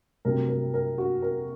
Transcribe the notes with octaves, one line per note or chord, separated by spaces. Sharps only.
C2 C3 F#3 A3 A#4
A#4
A#4
F#4
A#4